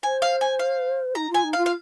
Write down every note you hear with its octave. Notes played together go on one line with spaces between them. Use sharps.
C5 G#5
F5
G#5
F5
D#4 A#5
F4 G#5
D#4
F5
F4
F5